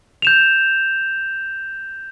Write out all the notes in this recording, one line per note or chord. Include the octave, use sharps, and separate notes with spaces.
G6 E7 F7